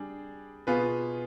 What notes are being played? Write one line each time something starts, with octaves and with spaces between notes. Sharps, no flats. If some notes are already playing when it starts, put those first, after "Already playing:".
Already playing: G3 D4 G#4
B2 B3 F4 G#4 B4